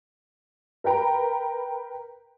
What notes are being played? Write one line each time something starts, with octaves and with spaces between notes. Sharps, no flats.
A#4 B4 G5 A#5 B5